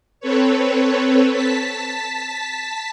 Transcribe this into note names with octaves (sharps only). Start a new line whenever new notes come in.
C4 A4 B4 C#5
A5 B6